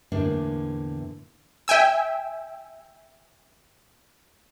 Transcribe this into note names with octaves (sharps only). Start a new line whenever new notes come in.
E2 A2 D3 A#3 D4
E5 G5 G#5 E6